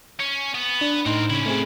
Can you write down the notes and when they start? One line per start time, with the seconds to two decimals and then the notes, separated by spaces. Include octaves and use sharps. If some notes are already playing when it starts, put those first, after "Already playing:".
0.20 C#4
0.54 B3
0.81 D4
1.06 A2 C4 D#4 A#4 C6
1.30 C#3 C#4 E4
1.46 A3 C4 G#4